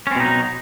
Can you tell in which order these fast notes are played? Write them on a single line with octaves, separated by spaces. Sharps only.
C#4 C4 B2 D#4 F#3